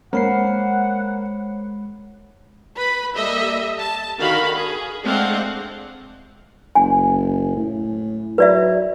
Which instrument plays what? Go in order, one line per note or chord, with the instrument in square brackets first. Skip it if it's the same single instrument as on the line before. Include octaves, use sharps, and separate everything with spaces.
[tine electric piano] G#3 B5 C7 [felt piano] A#3 [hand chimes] C5 C#5 [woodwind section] F#5
[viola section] B4 B5
G3 A#3 A4 D#5 E5
A5
D3 D#3 F#4 A#4 F5 B5
G#4
G#3 A3 C4 D4 F5 F#5
[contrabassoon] F#1 [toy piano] G#5
[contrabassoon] A2
[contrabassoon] F#3 [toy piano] B4 D5 E5